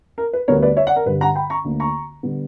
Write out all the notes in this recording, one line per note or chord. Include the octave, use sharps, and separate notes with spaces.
A#4
B4
D2 D3 G3 B3 A#4 C#5
B4 D5
C#5 E5
D5 F#5
A#4
G2 D3 G3 B4
F#5 A#5
G5 B5
A#5 C#6
D2 D3 A#3
A#5 C#6
D3 G3 B3